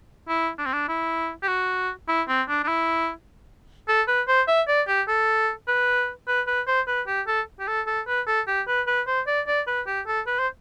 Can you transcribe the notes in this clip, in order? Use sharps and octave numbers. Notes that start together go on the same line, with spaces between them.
E4
D4
C4
D4
E4
G4
F#4
E4
C4
D4
D4
E4
A4
B4
C5
E5
D5
G4
A4
B4
B4
B4
C5
B4
G4
A4
G4
A4
A4
B4
A4
G4
B4
B4
C5
D5
D5
B4
G4
A4
B4
C5